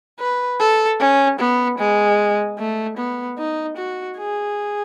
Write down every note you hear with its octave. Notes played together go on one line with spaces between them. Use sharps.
B4
A4
C#4
B3
G#3
A3
B3
D#4
F#4
G#4